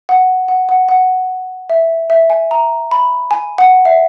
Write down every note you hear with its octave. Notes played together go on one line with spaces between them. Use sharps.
F#5
F#5
F#5
F#5
E5
E5
G#5
A#5
B5
G#5
F#5
E5